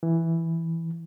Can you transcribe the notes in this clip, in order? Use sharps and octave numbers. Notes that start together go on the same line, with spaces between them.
E3